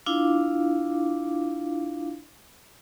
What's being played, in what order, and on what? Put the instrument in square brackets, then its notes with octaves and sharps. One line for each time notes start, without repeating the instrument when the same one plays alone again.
[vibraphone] D4 E4 F4 F5 D6